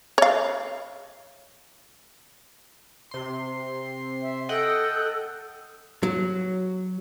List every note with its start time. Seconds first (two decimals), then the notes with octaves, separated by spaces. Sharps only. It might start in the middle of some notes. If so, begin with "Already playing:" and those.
0.18 C#5 F5
3.11 C3 C6
4.22 E5
4.49 A4 D#5 F#5 G5
6.03 F#3